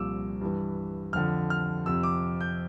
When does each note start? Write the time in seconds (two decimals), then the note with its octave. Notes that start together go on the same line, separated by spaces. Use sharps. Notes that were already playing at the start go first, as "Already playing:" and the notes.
Already playing: C2 A#2 F3 D6 E6
0.41 G2 E3
1.13 F2 D3 F3 F6
1.50 F6
1.86 F2 C3 F3 E6
2.03 D6
2.41 G6